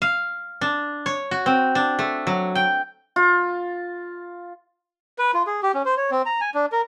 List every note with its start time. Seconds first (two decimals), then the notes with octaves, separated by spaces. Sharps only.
0.02 F5
0.61 D4
1.06 C#5
1.31 F#4
1.46 C4
1.75 D4
1.99 A3
2.27 F#3
2.55 G5
3.16 F4
5.18 B4
5.34 F4
5.47 G#4
5.63 G4
5.74 C#4
5.85 C5
5.97 C#5
6.11 C4
6.26 A#5
6.41 G#5
6.54 D4
6.72 A#4